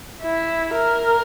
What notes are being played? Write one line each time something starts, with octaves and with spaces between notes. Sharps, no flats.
E4
A#4